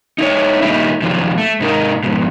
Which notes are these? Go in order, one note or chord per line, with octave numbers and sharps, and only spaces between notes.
D#4 E4 A4 C#5
A#2 D#3 G3 D#4 E4
F#2 C3 D#3 F3
A3
G#2 C3 D#4 G#4 A#4
F2 G#2 B2